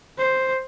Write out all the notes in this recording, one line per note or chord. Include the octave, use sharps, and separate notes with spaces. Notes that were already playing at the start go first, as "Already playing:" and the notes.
C5